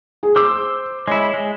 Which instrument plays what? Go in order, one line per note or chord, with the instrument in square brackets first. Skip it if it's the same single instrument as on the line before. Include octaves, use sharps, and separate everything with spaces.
[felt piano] G#4
[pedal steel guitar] C5 E6 [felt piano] D6
[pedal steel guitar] G#3 E4 [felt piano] C#5
[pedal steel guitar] G#3